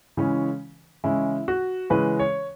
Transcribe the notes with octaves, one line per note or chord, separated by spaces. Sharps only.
C#3 E3 G#3 C#4
C#3 E3 G#3 C#4 E4
F#4
C#3 E3 G#3 C#4 B4
C#5